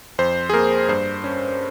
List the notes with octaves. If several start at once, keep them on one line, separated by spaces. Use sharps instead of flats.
F2 C5
G#4
A#3 A#4
G2 C5
C#4